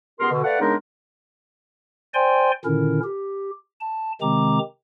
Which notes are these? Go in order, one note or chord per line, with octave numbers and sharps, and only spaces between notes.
C#2 B3 G4 A#4 C6
B2 D3
A3 B4 D5 F5 F#5
C#3 G#3 B3 D4 D#4 A#4
C5 D5 G5 G#5 C6
A#2 D3 D#3 C#4 E4 A#4
G4
A5
C3 D#3 G#3 C4 A#5 D6